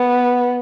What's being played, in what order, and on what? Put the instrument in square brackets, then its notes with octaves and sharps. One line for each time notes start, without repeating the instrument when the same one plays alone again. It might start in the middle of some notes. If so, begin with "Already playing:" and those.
Already playing: [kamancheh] B3